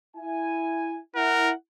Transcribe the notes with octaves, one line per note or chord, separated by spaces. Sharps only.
E4 G#5
E4 A#4 F#5